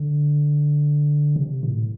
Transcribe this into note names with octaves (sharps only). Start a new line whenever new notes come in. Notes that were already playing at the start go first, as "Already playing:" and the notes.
Already playing: D3
C3
A2